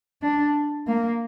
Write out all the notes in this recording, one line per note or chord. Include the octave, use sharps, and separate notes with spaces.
D4
A#3